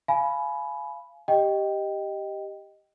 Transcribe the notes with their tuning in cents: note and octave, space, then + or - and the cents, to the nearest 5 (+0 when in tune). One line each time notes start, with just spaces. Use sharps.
F5 -15 G#5 +30 B5 +0
G4 +0 D#5 +0 G5 +0